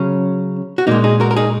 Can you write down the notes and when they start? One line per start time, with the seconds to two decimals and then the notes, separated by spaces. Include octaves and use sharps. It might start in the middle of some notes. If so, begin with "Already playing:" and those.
Already playing: C#3 F#3 C#4
0.78 F#4
0.87 A#2 G#3 A#3 D#4
1.04 D#4 G#4
1.20 F#4 A#4
1.31 A#4
1.37 D#4 G#4